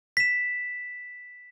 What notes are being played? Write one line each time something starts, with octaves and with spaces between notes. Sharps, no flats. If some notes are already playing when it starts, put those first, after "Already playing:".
B6 E7